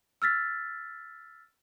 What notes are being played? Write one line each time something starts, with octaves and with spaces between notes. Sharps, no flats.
E6 F6 A6 B6